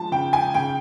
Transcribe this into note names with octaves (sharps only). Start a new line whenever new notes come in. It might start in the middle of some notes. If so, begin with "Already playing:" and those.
Already playing: F3 G#3 A5
C#3 G5
G#5
C#3 G5